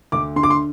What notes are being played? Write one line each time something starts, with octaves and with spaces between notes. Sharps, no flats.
D2 D6
D3 C6
D6
C6